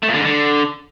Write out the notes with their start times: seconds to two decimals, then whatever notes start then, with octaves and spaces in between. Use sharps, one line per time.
0.03 A3
0.08 A#2
0.14 D3
0.19 G#2
0.25 D3